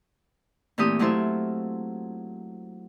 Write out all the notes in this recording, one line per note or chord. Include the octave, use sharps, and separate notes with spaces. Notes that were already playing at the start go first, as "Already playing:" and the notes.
A#2 E3 A3 C4 G4 D#6
F#3 A3 E4 F4 C5 E5